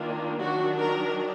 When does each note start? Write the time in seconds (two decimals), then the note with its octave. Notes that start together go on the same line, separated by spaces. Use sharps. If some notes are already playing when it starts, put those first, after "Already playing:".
Already playing: D#3 A#3 D4 F4
0.41 D#3 F#3 D4 F#4
0.77 A#4